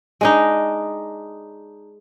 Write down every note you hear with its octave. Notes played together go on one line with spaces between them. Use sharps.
G#3 D4 D#4